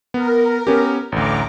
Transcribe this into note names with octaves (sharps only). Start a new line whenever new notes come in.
B3 A#4
B3 C#4 G4
A1 D2 A#5 D6